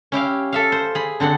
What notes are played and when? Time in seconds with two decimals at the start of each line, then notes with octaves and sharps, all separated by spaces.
0.12 C#4 E4 G4 F5
0.53 A4 E5 F5
0.72 C5
0.95 G#4 B5
1.20 D3 C4 D4 F#5